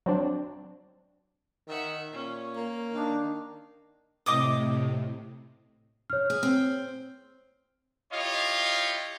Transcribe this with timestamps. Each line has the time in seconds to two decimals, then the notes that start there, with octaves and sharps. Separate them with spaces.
0.06 F#3 C4 D4
1.68 D#3 E5 F#5
2.13 A#2 C#4
2.56 A#3
2.93 D#3 D4 F5
4.26 A2 C3 D#5 D6 D#6
6.10 C#5 F6
6.30 G#4
6.43 C4
8.11 E4 F4 G4 C#5 D#5 F5